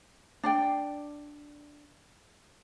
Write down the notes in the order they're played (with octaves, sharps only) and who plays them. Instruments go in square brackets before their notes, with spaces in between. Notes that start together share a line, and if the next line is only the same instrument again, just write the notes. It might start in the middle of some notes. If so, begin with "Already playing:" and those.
[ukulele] D4 D5 G5